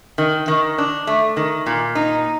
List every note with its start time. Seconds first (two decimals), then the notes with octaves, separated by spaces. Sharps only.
0.18 D#3
0.48 D#3
0.78 D4
1.07 A3
1.37 D#3
1.66 A#2
1.95 D#4